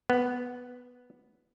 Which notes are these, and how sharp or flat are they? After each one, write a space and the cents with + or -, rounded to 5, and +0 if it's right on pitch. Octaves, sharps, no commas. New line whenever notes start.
B3 +0